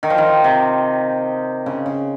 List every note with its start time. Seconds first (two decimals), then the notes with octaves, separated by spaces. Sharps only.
0.03 D#3
0.10 F3
0.18 D#3
0.44 C3
1.66 C#3
1.86 C#3